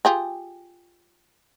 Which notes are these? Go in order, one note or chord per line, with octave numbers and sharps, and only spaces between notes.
F4 G4 G#4